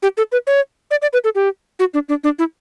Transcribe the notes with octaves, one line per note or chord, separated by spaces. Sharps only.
G4
A4
B4
C#5
D5
D5
B4
A4
G4
F#4
D4
D4
D4
E4